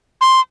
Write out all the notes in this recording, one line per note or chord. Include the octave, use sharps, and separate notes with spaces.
C6